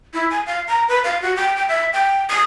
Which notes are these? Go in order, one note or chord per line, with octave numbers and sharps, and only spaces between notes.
E4
G#5
F5
A#5
B4
F5
F#4
G5
G5
E5
G5
D#6